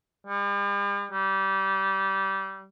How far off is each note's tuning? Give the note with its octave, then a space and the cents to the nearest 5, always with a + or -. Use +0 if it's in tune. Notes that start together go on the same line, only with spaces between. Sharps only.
G3 +45
G3 -20